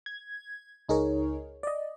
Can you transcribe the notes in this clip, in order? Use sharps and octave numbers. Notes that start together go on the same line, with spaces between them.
G#6
C#2 D#4 G#4 A#4 C#5
D5 D#5